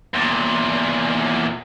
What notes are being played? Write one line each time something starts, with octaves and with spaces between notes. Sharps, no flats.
E2 A#2